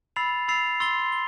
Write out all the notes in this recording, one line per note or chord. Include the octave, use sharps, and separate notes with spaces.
B5 E6 A6 C7 F7
B5 E6 A6 C7 F7
C6 E6 A6 C7 G7
G7